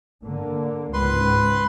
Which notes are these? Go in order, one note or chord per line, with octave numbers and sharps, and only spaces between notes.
D3 A#3
C#2 G#2 B4 C6